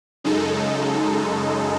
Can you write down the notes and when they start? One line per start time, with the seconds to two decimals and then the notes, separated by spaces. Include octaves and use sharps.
0.24 F#2 C#3 G#3 D#4 A4